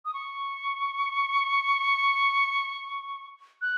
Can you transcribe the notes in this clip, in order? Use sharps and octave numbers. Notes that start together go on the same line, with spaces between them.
D#6
C#6
F#6